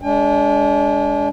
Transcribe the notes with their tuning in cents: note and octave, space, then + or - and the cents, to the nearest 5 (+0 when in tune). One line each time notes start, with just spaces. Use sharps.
G#3 +0 D4 -35 G5 +45